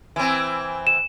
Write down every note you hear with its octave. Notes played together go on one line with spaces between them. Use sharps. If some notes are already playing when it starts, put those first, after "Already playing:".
E3 C4
E7